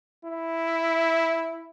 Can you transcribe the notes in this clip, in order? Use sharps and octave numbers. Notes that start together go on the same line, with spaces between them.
E4